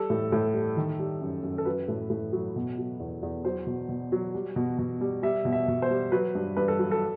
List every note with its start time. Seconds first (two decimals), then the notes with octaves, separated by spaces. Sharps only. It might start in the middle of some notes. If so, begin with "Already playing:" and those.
Already playing: G3 A4
0.10 A2
0.32 A2
0.54 G3
0.77 D#3
0.99 G3
1.21 F#2
1.43 F#2
1.58 A4
1.65 F#3 B4
1.88 A2
2.10 A2
2.33 F#3
2.56 B2
2.78 F#3
3.00 E2
3.23 E2
3.45 F#3 C5
3.67 B2
3.89 B2
4.12 F#3
4.34 G3
4.56 B2
4.78 B2
5.01 G3
5.23 G3 E5
5.45 B2
5.52 E5
5.68 B2
5.82 C5
5.91 G3
6.12 F#3 B4
6.35 G2
6.57 G2 B4
6.68 A4
6.79 F#3
6.91 A4